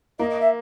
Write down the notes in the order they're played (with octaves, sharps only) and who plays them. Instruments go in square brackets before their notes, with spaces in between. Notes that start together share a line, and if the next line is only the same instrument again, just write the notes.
[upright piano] A#3 [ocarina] D#5
[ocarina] D#5
E5